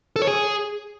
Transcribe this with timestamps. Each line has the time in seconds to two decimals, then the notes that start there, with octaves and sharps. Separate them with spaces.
0.16 A4
0.22 C#5
0.27 G#4